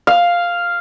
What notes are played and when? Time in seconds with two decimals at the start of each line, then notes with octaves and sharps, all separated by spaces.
0.07 F5